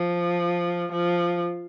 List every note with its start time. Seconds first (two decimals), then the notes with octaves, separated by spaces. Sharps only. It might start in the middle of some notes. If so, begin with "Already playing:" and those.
Already playing: F3
0.92 F3